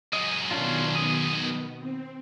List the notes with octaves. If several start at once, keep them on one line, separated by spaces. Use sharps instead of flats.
F#2 G#3 D#5
B2 D#3 B3 C#4 D4 F4
D#6
C4